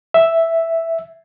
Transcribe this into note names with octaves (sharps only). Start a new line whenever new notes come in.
E5